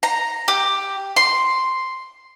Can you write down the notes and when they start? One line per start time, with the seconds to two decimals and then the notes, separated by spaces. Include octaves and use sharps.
0.03 A#5
0.48 G4
1.16 C6